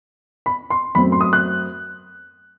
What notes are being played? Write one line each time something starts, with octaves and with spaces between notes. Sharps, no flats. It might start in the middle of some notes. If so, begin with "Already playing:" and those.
B5
C6
F#2 F#3 A3 C4 B5
C6
D#6
F#6